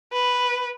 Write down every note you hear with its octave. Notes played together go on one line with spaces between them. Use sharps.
B4